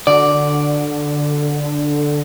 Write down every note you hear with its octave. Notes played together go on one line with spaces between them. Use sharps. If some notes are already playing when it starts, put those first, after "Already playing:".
D3 F#4 D5